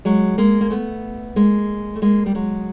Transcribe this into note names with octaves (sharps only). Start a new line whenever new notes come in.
F#3 G#3
G#3 A#3
A#3
A3 B3
G#3 A#3
A3
G#3 A#3
G3
F#3 G#3